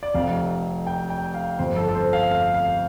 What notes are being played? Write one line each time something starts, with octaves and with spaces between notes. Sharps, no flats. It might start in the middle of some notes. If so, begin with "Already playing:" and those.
D5
F1 F2 C3 F5
G5
G5
F5
G1 F2 F3 C5
A4
A4
C5
F5
F5
F5